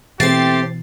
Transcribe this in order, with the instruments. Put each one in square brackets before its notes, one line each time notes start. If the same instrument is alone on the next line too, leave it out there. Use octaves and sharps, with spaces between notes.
[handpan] B2 E3 [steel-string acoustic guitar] A3 C4 [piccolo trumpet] G4 [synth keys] A6 C7